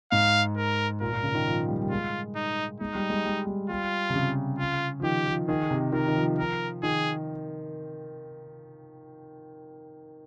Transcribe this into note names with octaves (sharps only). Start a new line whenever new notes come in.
G#2 F5
A#4
A#2 A#4
A#2
C#3
D#3
F3
G3
G3
G#3 F4
D#4
G#3 D#4
G3
G#3
G3
G3
G3 F4
C3
C#3
F4
F3
D#3 G4
F3
D#3 G#4
C3
D#3 A#4
D#3
F3
A#4
D#3 G#4